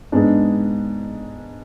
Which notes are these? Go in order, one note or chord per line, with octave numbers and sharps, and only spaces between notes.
G#2 G#3 B3 D4